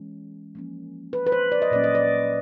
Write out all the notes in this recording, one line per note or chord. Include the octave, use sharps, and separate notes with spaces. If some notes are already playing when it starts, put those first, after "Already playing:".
Already playing: E3 G#3 C#4
F3 A#3 C#4
B4
B4
C5
D5
D#5
A#2 F#3 A#3 C#4 D5
D#5
D5